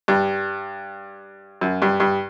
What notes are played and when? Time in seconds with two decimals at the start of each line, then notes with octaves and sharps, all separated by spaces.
0.08 G2
1.61 F#2
1.82 G2
2.00 G2